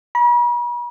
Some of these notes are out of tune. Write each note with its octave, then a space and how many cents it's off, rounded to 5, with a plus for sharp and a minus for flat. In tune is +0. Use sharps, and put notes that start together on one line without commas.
B5 -45